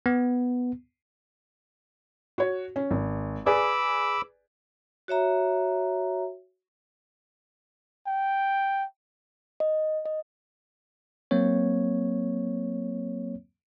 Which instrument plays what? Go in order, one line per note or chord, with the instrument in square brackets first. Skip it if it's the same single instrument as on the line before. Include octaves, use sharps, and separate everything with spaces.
[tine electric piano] B3
[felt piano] F#4 C#5
C#4
G#1
[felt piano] G#4 B4 D5 [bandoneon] B5 D6 E6
[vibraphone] F#4 C#5 E5 A#5
[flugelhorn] G5
[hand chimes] D#5
D#5
[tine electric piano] F#3 A#3 C4 C#5